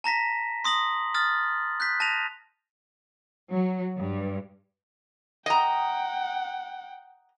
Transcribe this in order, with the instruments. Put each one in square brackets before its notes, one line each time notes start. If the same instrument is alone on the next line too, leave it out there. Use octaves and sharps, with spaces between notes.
[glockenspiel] A5 A#5 A#6 B6
C6 D#6 A#6 F#7
D#6 F6 A6
F#6 G6 B6
A5 A#6 D#7 F7
[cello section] F#3
G2
[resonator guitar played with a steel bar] D#5 A#5 [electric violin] F#5 G5